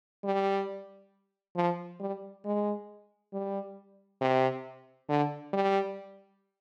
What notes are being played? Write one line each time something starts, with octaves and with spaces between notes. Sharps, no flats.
G3
F3
G3
G#3
G3
C3
D3
G3